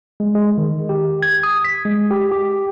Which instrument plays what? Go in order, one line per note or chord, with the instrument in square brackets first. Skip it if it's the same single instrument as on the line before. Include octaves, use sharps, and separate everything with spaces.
[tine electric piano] G#3
G#3
D#3
G4
G#6
D#6
B6
G#3
G4
G4